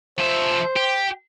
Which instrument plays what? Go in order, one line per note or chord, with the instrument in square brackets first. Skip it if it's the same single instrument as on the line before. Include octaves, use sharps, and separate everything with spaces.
[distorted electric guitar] F3 E5 [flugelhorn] C5
[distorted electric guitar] G4